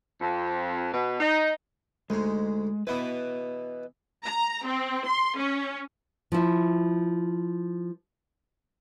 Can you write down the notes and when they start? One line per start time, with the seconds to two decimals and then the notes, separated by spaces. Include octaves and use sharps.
0.21 F2
0.94 B2
1.20 D#4
2.10 D2 G#2 G#3
2.87 E3 B3 B4 D#5
4.24 A#5
4.66 C4
5.06 C6
5.38 C#4
6.32 F3 E4